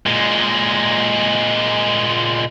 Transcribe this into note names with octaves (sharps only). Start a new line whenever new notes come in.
A#2 G#3